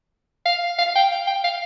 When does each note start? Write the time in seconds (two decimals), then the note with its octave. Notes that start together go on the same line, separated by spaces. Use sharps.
0.46 F5
0.78 F5
0.95 G5
1.12 F5
1.27 G5
1.44 F5